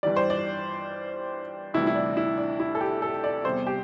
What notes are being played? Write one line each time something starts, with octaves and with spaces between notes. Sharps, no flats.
G2 E3 G3 D5
C5
D5
D2 C3 E3 G3 E4
E4
D4
E4
D4
E4
A4
G4
A4
D5
E2 C3 G3 C5
G4